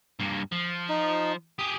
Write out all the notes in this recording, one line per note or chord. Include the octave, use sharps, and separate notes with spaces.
G2 A#3
F3
D#4
G4 G#4 D#6